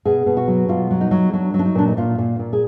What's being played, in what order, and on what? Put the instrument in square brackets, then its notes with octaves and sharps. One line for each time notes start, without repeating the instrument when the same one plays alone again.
[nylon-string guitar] B2 G#4
B2
F#4
F#3
B2 F4
F#3
D#4
F#3
F#3 D4
F#3
D4
D#4
A#2 D4
D#4
A#2 F4
A#2
A#2
G#4